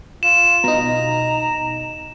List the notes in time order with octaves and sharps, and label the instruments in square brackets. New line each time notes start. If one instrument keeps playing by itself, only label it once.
[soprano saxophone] F4 [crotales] E7
[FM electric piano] B2 D#4 [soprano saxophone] A#5